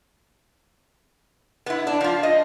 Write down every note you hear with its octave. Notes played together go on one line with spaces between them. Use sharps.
B3 E4
D4
F3 F4
D#5